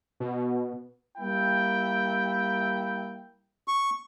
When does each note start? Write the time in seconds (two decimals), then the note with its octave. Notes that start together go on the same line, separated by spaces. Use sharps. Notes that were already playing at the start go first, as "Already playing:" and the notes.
0.20 B2
1.18 G3 A#3 E4 G5
3.68 C#6